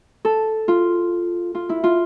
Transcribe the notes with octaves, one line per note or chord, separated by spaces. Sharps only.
A4
F4
F4
E4
F4